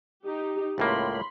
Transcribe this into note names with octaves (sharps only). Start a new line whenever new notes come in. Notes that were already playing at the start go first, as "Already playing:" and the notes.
D#4 G4
C#2 A2 A#3 B5 C6